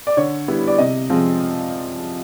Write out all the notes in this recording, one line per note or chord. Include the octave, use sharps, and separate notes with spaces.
D5
D3 C#5
G3 B3 E4
D5
C3 D#5
F3 G#3 C4